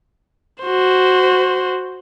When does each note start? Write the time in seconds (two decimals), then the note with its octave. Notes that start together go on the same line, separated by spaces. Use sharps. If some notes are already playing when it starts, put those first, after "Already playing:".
0.63 F#4 C5